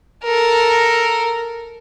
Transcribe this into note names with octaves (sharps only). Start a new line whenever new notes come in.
A4 A#4